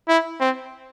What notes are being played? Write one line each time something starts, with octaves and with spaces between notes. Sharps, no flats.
E4
C4